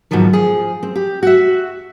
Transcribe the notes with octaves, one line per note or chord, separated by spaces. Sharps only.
G#2 B2 D#3 F3 F#3
F3 G#4
C4
G4
F#4 E5